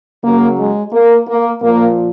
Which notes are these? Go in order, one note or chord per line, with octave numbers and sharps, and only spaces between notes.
C#3 F#3 A#3
G#3
A#3
A#3
A#2 F3 A#3